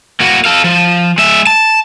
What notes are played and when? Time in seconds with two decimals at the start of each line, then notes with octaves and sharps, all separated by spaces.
0.20 A#3 F#4
0.45 A4 F5
0.64 F3
1.18 G#3 E5
1.47 A5